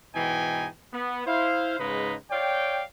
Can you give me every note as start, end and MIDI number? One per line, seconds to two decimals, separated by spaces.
0.15 0.68 44
0.15 0.68 47
0.15 0.68 52
0.15 0.68 63
0.15 0.68 79
0.15 0.68 80
0.93 1.26 59
1.27 1.78 64
1.27 1.78 72
1.27 1.78 77
1.79 2.15 44
1.79 2.15 49
1.79 2.15 56
1.79 2.15 63
1.79 2.15 71
2.31 2.83 73
2.31 2.83 74
2.31 2.83 77
2.31 2.83 79